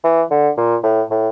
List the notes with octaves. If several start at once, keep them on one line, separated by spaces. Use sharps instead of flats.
E3
D3
A#2
A2
A2